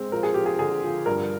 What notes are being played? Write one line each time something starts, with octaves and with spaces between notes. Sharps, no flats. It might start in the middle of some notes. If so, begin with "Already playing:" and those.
Already playing: G#3 C4
F3 A#4
G#4
F3 G4
G#4
D3 G#4
F3
G2 A#4